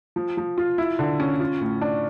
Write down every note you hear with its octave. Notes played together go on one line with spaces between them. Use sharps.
F3
F3
F4
E4
D3
C#4
F4
A2
D4